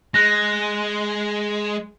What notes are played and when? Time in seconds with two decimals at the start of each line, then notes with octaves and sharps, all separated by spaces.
0.14 G#3 F#6 A#6